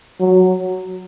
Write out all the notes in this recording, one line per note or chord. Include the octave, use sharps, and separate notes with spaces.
F#3